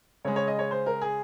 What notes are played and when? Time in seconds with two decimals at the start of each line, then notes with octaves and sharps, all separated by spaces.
0.25 C#3 G#3 C#5
0.36 C#5
0.47 D#5
0.59 C#5
0.71 C5
0.86 A#4
1.01 G#4